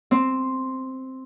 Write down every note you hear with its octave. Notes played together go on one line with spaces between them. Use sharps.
C4